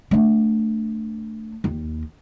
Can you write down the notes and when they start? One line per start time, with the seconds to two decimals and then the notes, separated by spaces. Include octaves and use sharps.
0.11 A3 D4
1.64 D#2